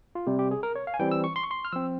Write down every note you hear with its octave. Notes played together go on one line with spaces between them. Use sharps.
F4
C3 G3 C4 G4
G4
G#4
A#4
C#5
F5
G#5
E3 G3 C4 G5
E6
C#6
C6
C#6
C6
F6
F3 C4 E6